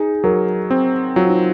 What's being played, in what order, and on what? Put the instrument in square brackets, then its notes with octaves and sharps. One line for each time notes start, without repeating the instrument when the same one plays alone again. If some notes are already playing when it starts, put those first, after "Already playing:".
Already playing: [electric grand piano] D#4 [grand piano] G#4
[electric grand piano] F#3 [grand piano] A#4
[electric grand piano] C4
[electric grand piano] F#3 [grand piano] F4
[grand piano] D#4